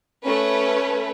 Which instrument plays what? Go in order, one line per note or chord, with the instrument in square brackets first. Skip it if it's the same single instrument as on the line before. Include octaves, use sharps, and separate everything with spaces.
[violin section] A3 C#4 B4